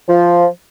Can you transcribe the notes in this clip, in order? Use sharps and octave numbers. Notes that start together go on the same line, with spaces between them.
F3